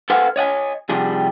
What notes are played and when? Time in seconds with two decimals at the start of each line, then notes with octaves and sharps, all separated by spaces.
0.10 A4 B4 C5 F5 F#5 G#5
0.36 C#5 D#5 F#5 G#5
0.89 C3 F3 G3 G#4